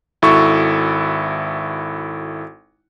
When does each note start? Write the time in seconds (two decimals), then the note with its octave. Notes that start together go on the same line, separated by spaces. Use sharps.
0.22 G#1 E4 F#4 A4 C#6